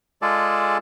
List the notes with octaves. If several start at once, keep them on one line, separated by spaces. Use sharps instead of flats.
G#3 F4 G#4 A4 D5 A5